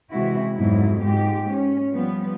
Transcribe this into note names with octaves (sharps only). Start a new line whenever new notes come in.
C3 E3 G#3 E4 F#4
F2 G#2 B2 F#3 E4
G#2 G#3 G4
C#4
F3 G3 B3